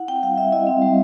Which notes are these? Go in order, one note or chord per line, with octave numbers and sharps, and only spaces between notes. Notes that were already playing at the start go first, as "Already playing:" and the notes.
Already playing: E4 F#5
C4 G5
G3 F5
G3 E5
E4 D#5
C4
G3